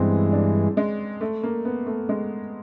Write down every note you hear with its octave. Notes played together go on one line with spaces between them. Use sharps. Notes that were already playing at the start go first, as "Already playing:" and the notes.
Already playing: G2 E3 G#3 B3 C4
D4
G#3
A3
A#3
B3
A3
G#3